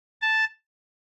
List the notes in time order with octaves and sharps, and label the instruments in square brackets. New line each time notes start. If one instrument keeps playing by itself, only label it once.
[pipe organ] A5